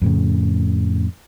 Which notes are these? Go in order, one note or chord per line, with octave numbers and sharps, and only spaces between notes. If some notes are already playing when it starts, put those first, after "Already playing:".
F2 A2 C#3